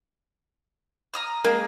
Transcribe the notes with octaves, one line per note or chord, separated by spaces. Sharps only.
A#5 D#6 F6
G#3 A#3 G#4 A#4